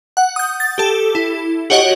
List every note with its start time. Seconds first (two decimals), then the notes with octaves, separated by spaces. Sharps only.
0.17 F#5
0.36 D#6 G6
0.60 A6
0.78 G4 A4
1.15 E4
1.70 F#4 G4 C#5 D#5 F#5